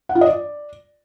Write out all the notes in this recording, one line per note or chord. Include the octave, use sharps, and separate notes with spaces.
F#5
F4
D#5
D5